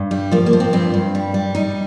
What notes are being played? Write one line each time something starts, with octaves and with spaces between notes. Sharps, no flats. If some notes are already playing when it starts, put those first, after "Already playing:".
Already playing: G2
G3
F3 A#3
A#3
F3
C4
G2 C4
G2
G3
G3
G3 D#4